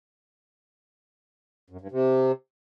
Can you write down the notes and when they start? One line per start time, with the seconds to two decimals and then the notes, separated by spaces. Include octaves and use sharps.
1.70 F#2
1.81 G2
1.91 C3